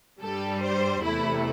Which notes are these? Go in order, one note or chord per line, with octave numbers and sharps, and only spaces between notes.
G2 G3 A4
C5
E2 C3 A3 E4